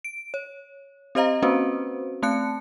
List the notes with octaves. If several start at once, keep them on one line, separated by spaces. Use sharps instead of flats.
D7
C#5
C4 G4 C5 D#5 F5 A#5
A#3 C4 C#4 F#4 B4 C5
A3 C4 A5 F#6 C#7